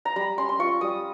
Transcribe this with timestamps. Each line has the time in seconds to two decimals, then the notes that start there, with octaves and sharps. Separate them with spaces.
0.05 A#5
0.16 G3 B5
0.37 C#4 C6
0.49 C6
0.59 F4 C#6
0.81 G3 D#6